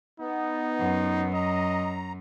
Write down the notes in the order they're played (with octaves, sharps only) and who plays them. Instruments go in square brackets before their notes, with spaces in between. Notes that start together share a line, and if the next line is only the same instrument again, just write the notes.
[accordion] B3 [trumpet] D#4
[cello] F#2
[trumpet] D#5 [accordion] A#5